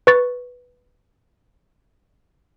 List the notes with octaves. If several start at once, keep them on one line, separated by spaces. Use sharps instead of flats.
B4 C#6 A6